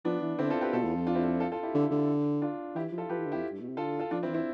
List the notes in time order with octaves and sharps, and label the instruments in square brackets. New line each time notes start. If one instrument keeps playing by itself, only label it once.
[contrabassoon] F3 [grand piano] B3 D4
[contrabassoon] E3
[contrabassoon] D3 [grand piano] C4 E4
[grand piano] F4 A4
G4 B4
[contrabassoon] B2 [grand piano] F4 A4
[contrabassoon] E2
F2
[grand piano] D4 F4
C4 E4
F4 A4
F4 A4
F4 A4
E4 G4
[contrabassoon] D3
D3
[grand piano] D4 F4
[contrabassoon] E3 [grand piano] E4 G4
[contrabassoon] F3
[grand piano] F4 A4
[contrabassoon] F3 [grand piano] G4 B4
[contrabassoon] E3
D3
[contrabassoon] F2 [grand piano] E4 G4
[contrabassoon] G2
B2
C3
[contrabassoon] D3 [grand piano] F4 A4
[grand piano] F4 A4
[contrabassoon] F3 [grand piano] D4 F4
[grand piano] C4 E4
[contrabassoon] E3
[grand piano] C4 E4